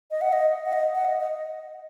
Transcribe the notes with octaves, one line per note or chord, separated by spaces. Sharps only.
D#5
F#5
D#5
F#5
D#5
F#5
D#5
D#5